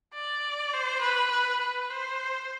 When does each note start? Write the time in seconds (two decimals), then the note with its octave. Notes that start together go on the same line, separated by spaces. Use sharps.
0.14 D5
0.73 C5
1.01 B4
1.31 B4
1.61 B4
1.90 C5